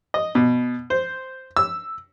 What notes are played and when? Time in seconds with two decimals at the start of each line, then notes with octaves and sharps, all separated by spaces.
0.14 D#5
0.35 B2
0.90 C5
1.57 E6